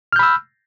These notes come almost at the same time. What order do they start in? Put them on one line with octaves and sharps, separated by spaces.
F6 G6 B5 E6